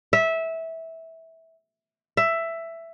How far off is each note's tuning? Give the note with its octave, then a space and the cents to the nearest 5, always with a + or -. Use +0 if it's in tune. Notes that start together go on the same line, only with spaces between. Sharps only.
E5 -15
E5 +10